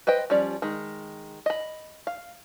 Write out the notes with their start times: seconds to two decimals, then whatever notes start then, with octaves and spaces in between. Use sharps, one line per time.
0.07 B4 C5 D#5 G5
0.30 F3 G3 C#4 D5
0.62 D#3 G#3
1.46 D#5 B5
2.07 F5